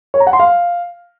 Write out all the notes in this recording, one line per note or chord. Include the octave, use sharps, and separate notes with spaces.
C#5
A#5
F#5
C6
F5